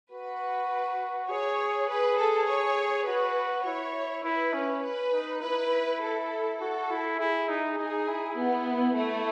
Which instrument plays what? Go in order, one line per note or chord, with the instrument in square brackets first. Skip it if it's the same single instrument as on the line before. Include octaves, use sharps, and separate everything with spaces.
[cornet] F#4 [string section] B4
[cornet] G#4 [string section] C#5
[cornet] G#4 [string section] B4
[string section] A4
C#5
[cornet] F#4 [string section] B4
[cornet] E4 [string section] C#5
[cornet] E4 [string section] B4
[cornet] C#4
[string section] B4
[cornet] D#4
[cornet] E4 [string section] B4
[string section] A4
[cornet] F#4 [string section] A4
[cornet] E4
[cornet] E4 [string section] G#4
[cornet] D#4
[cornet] D#4 [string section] G#4
[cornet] E4
[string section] B3
A3